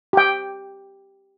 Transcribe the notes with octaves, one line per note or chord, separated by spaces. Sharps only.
G4 G5